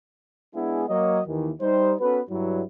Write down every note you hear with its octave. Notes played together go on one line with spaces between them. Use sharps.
G#3 B3 D4 E4 G#4
F#3 A#3 C#5 D#5
D#2 D#3 E3
G3 D#4 C5
B3 C#4 F#4 A4 B4
G2 F#3 E4